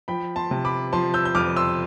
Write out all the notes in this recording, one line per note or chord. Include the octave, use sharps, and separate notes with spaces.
F3 G5 B5
A5 C6
C3
B5 D6
F3 A5 C6
E6 G6
G6
F2 D6 F6
C6 E6